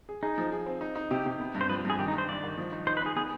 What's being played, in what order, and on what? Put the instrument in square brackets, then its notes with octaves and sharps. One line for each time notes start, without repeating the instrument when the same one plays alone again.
[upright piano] G#4
[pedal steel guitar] D#4 [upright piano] G#4
[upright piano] F3
G#4
C4
D#4
D#4
[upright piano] C3 [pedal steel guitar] G4
[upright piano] C3
B3
G2
[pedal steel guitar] C5
[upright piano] F3 [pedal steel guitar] B4
[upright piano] G2 [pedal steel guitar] G#4
[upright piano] D#3 [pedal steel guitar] G4
[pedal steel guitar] D#4
[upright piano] G2 [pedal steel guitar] C5
[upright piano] G2 [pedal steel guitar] D5
[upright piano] D#3
F3
D#4
[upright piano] D#4 [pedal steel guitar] C5
[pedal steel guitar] B4
[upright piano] D#4 [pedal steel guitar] G#4
[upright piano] B3 [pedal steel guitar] G#4